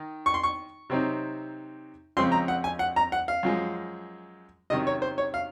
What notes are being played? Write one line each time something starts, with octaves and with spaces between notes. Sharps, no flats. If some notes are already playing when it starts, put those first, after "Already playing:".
Already playing: D#3 D#4
C#6
C6
C#6
C3 F#3 C4 D#4
F2 C#3 G#3 C4 C6
A#5
F#5
G#5
F#5
A#5
F#5
F5
F#2 F3 G#3
C3 D#3 F#3 C#4 D#5
C#5
C5
C#5
F5